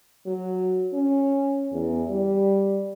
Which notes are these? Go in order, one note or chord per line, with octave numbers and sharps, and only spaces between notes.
F#3
C#4
E2
G3